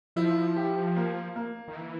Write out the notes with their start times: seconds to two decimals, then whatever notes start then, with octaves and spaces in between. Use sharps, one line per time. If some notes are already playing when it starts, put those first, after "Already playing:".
0.16 F3 E4
0.56 G4
0.96 A#3
1.36 A#3
1.68 D#3
1.76 E3